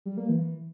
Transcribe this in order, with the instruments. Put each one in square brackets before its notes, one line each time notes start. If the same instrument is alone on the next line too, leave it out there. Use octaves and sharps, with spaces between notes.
[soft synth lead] G3
A#3
E3